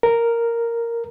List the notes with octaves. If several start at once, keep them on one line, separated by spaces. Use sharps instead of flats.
A#4